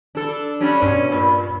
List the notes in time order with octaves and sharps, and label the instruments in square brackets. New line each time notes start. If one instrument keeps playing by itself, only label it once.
[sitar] D4 A4
G3 C#4 D4
[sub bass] G2 [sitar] B2 C#4
[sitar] A#2